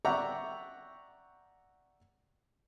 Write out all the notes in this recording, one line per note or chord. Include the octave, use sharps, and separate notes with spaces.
D5 E5 F#5 G5 A#5 C#6